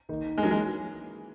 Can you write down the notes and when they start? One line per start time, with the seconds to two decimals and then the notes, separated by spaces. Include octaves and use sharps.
0.09 D#3 A#3 D#4
0.38 G#3
0.43 E3 F#3 A#3 C#4 G#4
0.51 G#3